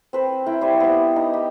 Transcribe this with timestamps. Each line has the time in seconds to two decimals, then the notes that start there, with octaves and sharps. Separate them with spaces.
0.13 C4 B4 C5
0.46 E4 A#4 G5
0.61 G3 C5 E5 G#5
0.80 B3 G4
1.16 D#4
1.34 G4